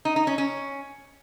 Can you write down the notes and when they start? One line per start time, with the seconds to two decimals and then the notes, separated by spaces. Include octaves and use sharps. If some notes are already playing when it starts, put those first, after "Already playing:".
0.05 D#4
0.16 D#4
0.27 C#4
0.38 C#4